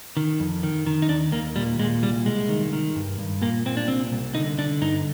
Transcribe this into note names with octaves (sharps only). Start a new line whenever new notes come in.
D#3
F2
D#3
D#3
D#4
D#2 D4
D#2 A#3
A#2 G3
A#2 G#3
C2 G3
C2 G#3
D#3
D#3
G2
G2
A#2 A#3
A#2 C4
D4
C2 C4
C2
D3 D#4
D3 D4
G2 D#4